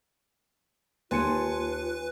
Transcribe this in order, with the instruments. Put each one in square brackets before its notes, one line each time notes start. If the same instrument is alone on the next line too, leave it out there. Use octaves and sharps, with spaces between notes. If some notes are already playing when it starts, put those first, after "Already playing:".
[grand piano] D#2 C#7 D#7 [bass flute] F4 [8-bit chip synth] B4 [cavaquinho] C5 G#5 A5